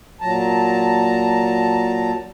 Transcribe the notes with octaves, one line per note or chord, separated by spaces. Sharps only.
A#2 F#3 A5 A#5